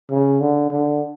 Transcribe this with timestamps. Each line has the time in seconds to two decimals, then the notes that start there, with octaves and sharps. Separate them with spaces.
0.11 C#3
0.41 D3
0.71 D3